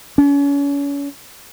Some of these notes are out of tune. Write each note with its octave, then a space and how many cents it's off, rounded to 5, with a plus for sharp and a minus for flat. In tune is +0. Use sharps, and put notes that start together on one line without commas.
C#4 +35